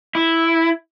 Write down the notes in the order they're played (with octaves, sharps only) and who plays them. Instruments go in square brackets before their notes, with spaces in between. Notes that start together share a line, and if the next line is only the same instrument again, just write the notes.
[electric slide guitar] E4